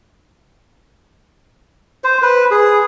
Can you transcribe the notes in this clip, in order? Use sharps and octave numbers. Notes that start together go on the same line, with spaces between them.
C5
B4
G#4